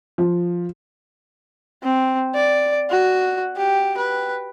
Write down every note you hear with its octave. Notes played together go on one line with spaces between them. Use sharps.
F3
C4
D5
F#4
G4
B4